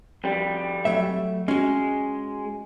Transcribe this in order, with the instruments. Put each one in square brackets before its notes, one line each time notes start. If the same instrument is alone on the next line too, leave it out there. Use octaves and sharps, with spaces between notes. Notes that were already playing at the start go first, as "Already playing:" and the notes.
[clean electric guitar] F2 G3
[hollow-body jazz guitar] F#3 A3 E5
[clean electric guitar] G#3 [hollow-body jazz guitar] C#4 F#4